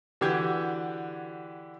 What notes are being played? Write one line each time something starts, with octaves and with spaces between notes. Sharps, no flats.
D3 E3 F#4 G4 G6 G#6